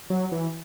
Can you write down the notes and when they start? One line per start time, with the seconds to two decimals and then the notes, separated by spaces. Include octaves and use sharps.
0.10 F#3
0.32 E3